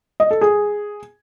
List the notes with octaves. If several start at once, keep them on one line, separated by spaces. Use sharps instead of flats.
D#5
A4
G#4